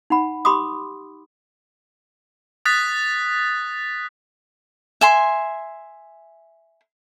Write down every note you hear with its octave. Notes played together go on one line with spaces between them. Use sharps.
D#4 F#5 B5
G4 B5 C6 D6 D#6
D#6 F#6 A6 B6
E5 G#5 C6